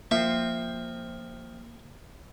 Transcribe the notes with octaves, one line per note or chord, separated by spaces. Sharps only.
F3 A#3 C4 E5